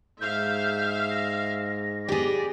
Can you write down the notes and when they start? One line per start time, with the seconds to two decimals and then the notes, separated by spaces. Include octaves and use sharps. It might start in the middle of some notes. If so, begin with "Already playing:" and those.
0.21 G#2 E5 F5 G6
1.11 A#6
2.08 B3 G4 G#4 D5